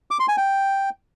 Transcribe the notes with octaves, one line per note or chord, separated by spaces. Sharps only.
D6
C6
G#5
G5